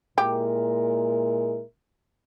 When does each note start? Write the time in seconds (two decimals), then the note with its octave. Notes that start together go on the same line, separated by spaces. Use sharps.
0.17 A#2 G#3 E4 G4 A#4